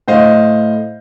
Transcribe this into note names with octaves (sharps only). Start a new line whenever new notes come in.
A2 C5 D#5 F5